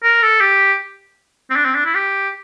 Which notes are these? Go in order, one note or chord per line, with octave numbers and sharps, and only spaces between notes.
A#4
A4
G4
C4
D4
C4
D4
E4
G4